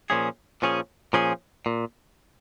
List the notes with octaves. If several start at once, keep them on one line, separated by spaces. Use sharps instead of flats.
A#2 F3 C#4 G#4
A#2 F3 C#4 G#4
A#2 F3 C#4 G#4
A#2